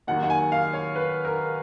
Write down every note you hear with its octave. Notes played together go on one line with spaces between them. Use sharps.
D#2 D#3 F#3 F#5
F#5
G#5
F5
C#5
B4
A#4